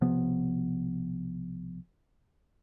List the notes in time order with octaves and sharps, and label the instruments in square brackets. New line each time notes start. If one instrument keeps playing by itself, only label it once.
[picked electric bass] B1 C3 F3 B3